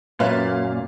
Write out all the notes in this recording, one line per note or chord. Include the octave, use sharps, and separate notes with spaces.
F#2 A#2 B4 C#5 E5 F5